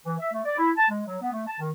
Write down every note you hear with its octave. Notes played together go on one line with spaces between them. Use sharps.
E3
E5
A3
D5
E4
A5
G#3
F#3
B3
A3
A5
D#3